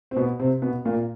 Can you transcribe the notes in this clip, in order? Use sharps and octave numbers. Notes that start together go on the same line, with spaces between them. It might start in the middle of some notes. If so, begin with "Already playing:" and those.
C4
B2 B3
C3 C4
B2 B3
A#2 A#3